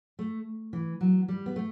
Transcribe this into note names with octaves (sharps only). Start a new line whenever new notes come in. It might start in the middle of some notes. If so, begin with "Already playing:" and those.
A3
E3
F#3
G3
B3
A3